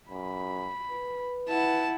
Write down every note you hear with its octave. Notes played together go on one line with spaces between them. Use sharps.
F#2 B5
B4
E4 F#5 A5